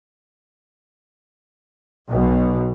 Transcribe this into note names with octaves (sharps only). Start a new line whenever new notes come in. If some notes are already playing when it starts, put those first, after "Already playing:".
B1 B2